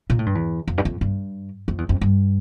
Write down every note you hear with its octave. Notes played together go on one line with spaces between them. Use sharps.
A#2
A2
G2
E2
F2
G2
F2
G2
F2
E2
F2
G2